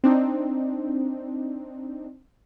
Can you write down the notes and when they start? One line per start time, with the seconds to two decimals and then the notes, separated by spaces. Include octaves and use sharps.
0.04 C4 D4 D#4